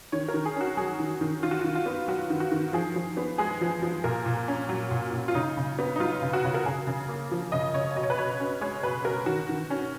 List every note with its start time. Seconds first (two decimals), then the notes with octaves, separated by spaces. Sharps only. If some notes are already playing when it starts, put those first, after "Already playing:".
0.12 D#3 C#5
0.28 A#4
0.34 D#3
0.46 G#4
0.56 C#4 F#4
0.77 F#3 G#4
0.99 D#3
1.21 D#3
1.43 D#3 F4
1.51 F#4
1.61 D#3 F4
1.75 F4
1.86 B3
2.08 F#3 F#4
2.30 D#3
2.40 F#4
2.52 D#3
2.73 F3 G#4
2.96 F3
3.17 B3
3.38 G#3 G#4
3.61 F3
3.82 F3
4.04 A#2 A#4
4.26 A#2
4.48 C#4
4.69 F#3
4.91 A#2
5.13 A#2
5.28 F4
5.35 C#3 D#4
5.57 C#3
5.79 B3
5.96 D#4
6.00 F#3 F4
6.22 C#3
6.33 F#4
6.44 C#3
6.54 A#4
6.66 C#3 G#4
6.87 C#3
7.08 A#3
7.31 F3
7.52 C#3 D#5
7.74 C#3 C#5
7.96 B2 D#5
8.03 C#5
8.10 B4
8.17 B2 C#5
8.40 C#4
8.61 G#3 C#5
8.83 B2 B4
9.04 B2 A#4
9.26 D#3 F#4
9.49 D#3
9.70 C#4